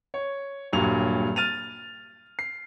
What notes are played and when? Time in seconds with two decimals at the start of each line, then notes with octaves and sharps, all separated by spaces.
0.14 C#5
0.73 D#1 G2 A#2 F#3 C#5 F7
1.36 F6 A6 D#7 F7
2.39 C7